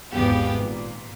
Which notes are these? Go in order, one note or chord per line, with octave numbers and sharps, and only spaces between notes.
G#1 E2 B3 G4 F5
A#2